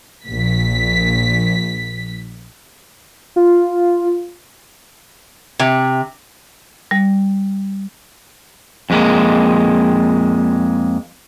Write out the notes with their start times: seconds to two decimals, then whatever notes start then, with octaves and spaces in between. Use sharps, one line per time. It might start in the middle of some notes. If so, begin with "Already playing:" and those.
0.25 A#1 B6
3.36 F4
5.59 C3
6.91 G3
8.90 F2 G#3 A#3